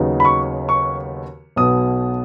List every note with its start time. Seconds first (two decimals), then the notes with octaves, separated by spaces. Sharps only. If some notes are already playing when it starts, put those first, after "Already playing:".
Already playing: D#2 C#3 F#3 B3 D#4
0.20 B5
0.25 C#6
0.69 C#6
1.56 B1 B2 B3 D#6